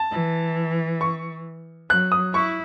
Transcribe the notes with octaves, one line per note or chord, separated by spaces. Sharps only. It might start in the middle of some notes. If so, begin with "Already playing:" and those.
Already playing: A5
E3
C#6
F#3 F#6
D#6
E4 C#6